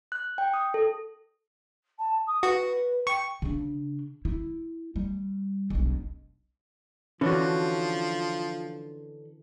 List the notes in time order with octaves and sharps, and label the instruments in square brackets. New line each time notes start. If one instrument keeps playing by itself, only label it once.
[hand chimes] F#6
G5
D#6
A4
[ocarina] A5
D#6
[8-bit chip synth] F#4 [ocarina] B4
[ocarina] G5 [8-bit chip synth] C#6
[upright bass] C#3 D4
E4
G3
E1 B1
[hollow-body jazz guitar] D3 C#4 [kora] E3 D4 F#4 [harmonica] F3